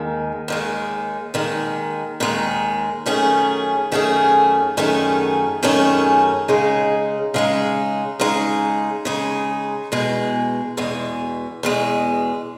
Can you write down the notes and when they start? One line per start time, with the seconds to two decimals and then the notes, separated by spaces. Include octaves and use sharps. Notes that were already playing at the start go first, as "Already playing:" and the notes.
Already playing: D#2 D#3 G#3
0.48 D#2 D#3 G#3
1.34 D#2 D#3 G#3
2.20 D#2 D#3 G#3
3.06 F#2 D#3 A3 C#4 G#4
3.92 F#2 D#3 A3 C#4 G#4
4.77 F#2 D#3 A3 C#4 G#4
5.63 F#2 D#3 A3 C#4 G#4
6.48 C#3 G#3 D#4
7.34 C#3 G#3 D#4
8.20 C#3 G#3 D#4
9.05 C#3 G#3 D#4
9.92 E2 B2 G#3
10.77 E2 B2 G#3
11.63 E2 B2 G#3